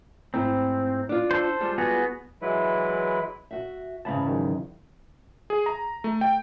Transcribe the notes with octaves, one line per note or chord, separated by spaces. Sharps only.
G#2 A3 C4 E4
D4 F4
A4 C5
G3 G#3 F4
B3 F#4 G#4
E3 F#3 G#3 E4 B4
F#4 E5
E2 G#2 C#3 A5 B5
D#3 F#3 G#3
G#4
A#5
A3
G5